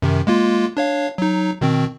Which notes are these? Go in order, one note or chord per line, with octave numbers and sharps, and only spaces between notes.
F#2 C3 D#3
G#3 A#3 F4
D4 C#5 F5
F#3 D#4
B2 D#3 C4